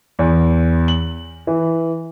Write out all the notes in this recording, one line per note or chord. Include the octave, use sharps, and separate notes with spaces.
E2
F#7
E3